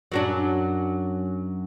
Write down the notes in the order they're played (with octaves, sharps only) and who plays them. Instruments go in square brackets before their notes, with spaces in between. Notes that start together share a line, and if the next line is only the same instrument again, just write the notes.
[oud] F#2 F#3 D4